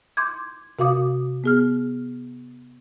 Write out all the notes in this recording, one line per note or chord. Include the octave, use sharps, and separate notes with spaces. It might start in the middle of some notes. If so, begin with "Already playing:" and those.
C6 D6 G6 G#6
C3 F#4 F5 D6 D#6
B3 G#4 F6